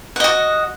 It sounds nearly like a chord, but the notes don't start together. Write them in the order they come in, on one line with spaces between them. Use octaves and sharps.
F#5 D#5 F#4